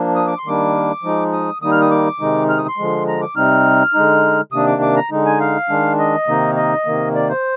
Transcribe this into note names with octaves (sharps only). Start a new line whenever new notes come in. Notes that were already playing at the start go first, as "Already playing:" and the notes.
Already playing: F3 A#3 D4
D#6
D6
C6
D#3 G3 A#3 D4 D6
F3 G#3 D#4
D#6
D#3 G3 A#3 D#4 D#6
F6
D#6
D6
C3 D#3 G#3 D#4
F6
D#6
C6
D3 F3 G#3
A#5
D6
C3 G3 C4 D#4 F6
D3 G#3 D#4
C3 D#3 A#3 D4 D#6
D6
D6
A#5
D3 G#3 D#4
G#5
F5
D#3 G#3 D4
D#5
C3 D#3 A#3 D#4
D#5
C3 D#3 A#3
D5
C5